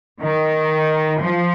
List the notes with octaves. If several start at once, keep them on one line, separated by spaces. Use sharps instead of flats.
D#3
F3